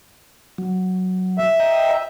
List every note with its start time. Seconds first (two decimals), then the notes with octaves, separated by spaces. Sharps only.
0.58 F#3
1.38 E5
1.60 D#5 G5 A#5